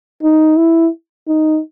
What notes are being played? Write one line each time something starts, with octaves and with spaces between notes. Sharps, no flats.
D#4
E4
D#4